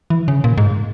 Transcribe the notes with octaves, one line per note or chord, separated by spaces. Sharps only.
E3
C#3
A#2
G#2